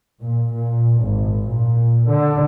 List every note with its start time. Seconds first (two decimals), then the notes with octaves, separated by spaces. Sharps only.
0.20 A#2
0.53 A#2
1.00 G#1
1.46 A#2
2.08 D3